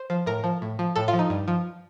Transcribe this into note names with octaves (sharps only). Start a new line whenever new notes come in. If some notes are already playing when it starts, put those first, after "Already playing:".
Already playing: C5
F3
A2 A#4
F3
A2
F3
A2 A4
F4
F3
D#4
G2
F3